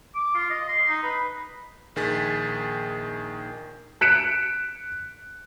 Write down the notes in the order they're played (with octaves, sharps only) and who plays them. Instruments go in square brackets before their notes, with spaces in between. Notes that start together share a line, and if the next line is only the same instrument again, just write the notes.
[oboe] D6
F4
D#5
C6
D#4
B4
[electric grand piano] A#1 D#3 G#4 A6 B6
[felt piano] F#6 B6 C#7 D7 E7